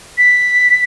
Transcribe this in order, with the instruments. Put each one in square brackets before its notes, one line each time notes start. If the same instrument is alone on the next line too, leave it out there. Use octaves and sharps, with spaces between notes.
[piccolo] B6